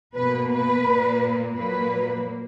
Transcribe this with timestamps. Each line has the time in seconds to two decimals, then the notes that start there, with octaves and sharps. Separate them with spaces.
0.15 B2 A#3 B4
0.50 B4
0.85 A#2 A#3
1.56 A#2 F#3 A#3 B4